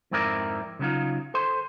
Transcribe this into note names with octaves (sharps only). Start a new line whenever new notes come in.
F2 G#2 C4 E4 A#4 D5
C#3 F#3 D#4 F4
A4 C5 C6